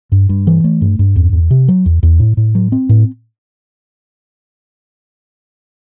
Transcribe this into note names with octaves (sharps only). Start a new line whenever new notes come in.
G2
G2
E3
A3
G2
G2
E2
E2
C3
F#3
E2
E2
A2
A2
F#3
C4
A2